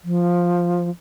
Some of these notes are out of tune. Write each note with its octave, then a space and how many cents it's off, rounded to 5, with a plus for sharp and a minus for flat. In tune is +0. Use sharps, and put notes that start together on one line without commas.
F3 +5